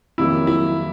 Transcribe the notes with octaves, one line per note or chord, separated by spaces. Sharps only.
F2 C3 D#3 F#3 A#3 E4
E4